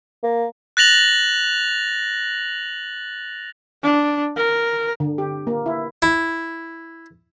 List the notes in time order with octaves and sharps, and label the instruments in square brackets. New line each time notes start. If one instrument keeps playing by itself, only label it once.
[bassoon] A#3
[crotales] F#6 A6 A#6 F7 F#7
[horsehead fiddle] D4
A#4
[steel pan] D3
G4
A#3
E4
[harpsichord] E4